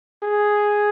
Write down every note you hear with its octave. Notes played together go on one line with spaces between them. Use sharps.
G#4